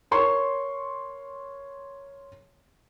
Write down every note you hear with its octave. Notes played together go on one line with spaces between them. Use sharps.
A#4 C#5 C6 C#6